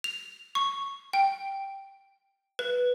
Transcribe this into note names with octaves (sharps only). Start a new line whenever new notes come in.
F7
C#6
G5
B4